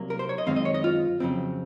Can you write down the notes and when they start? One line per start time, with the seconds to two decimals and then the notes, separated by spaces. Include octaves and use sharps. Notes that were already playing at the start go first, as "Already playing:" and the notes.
Already playing: C2 C3 F#3 A#3
0.10 A#4
0.19 C5
0.29 C#5
0.38 D#5
0.47 F#2 D#3 G#3 C4 F5
0.56 D#5
0.65 C#5
0.74 D#5
0.84 F4
1.20 F2 C#3 F#3 C4